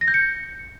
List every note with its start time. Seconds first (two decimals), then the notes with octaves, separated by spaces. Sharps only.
0.01 A#6
0.08 G6
0.14 C#7